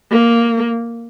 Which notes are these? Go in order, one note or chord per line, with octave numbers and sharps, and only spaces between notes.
A#3